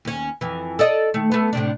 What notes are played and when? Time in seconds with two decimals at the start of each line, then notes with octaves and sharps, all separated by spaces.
0.05 D#2 C#4
0.41 F2 E3
0.79 A4 D5 D#5
1.14 D#3 A3
1.32 A3 B3
1.53 A2 C3 D4